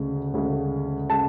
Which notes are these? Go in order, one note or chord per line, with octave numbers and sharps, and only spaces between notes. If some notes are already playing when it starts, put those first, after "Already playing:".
Already playing: D2 C#3 G#3
D2 C#3 G#3
C#3 G#3 A5